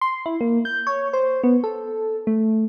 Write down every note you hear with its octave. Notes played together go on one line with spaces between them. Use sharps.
C6
E4
A#3
G6
C#5
C5
B3
A4
A3